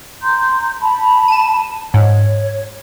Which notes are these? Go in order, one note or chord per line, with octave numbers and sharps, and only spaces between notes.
A#5 C6 G6
A5 B5
D#7 E7
G#2 C#5